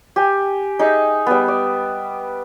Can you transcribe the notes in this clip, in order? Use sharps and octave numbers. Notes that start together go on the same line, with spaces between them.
G4 G#5
D#4 G#4 E5
G3 B3
D5